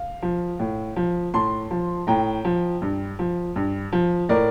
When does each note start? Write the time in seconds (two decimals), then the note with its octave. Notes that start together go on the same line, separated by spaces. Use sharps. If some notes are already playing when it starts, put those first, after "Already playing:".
Already playing: F5
0.22 F3
0.59 A2
0.96 F3
1.34 A2 A5 C6
1.71 F3
2.07 A2 G5 A#5
2.45 F3
2.82 G2
3.19 F3
3.56 G2
3.93 F3
4.29 A2 A#4 D5